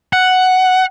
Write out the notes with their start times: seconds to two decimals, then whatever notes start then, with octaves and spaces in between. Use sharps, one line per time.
0.13 F#5